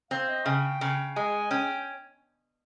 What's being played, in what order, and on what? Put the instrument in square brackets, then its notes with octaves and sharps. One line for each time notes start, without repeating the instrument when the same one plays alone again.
[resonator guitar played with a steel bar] C4 [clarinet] F5
[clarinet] D#5
[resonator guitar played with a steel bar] C#3 [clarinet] G5
[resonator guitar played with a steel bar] C#3
[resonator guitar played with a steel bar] G#3 [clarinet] G#5
[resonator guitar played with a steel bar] C#4 [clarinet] G5